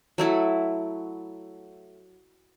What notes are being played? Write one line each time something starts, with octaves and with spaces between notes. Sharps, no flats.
F#3 A3 E4